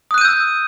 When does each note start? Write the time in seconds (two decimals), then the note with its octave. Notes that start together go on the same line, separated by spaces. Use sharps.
0.11 D#6
0.14 F#6
0.18 D#7
0.21 G6
0.25 E6